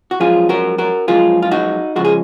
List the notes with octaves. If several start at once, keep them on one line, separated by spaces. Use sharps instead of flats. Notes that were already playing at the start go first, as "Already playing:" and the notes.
F#4
F#2 F3 G#3 F4 G#4
F#4 A#4
F#4 A#4
F#2 F3 G#3 F4 G#4
F4
D#4 F#4
C#3 F3 G#3 F#4
G#4